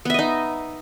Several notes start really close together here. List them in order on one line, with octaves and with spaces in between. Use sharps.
B3 E5 D#5 D#4